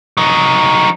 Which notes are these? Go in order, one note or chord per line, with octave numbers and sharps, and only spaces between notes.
F#3 D#4